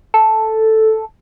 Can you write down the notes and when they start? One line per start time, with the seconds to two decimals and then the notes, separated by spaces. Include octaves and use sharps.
0.14 A4